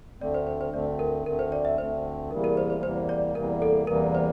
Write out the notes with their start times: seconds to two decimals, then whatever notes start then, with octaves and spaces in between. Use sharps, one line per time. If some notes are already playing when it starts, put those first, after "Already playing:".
0.21 D2 D3 A3 C4 D5
0.34 C5
0.47 C5
0.61 C5
0.73 D2 D3 A3 C4 D5
0.99 A#4
1.26 D2 D3 A3 C4 A#4
1.39 C5
1.52 D5
1.65 E5
1.78 D2 D3 A3 C4 C5
2.31 E2 C3 E3 G3 A#3 A#4
2.44 A#4
2.57 C5
2.70 C5
2.83 E2 C3 E3 G3 A#3 C5
3.09 D5
3.35 E2 C3 E3 G3 A#3 A#4
3.62 A4
3.87 E2 C3 E3 G3 A#3 A#4
4.15 C5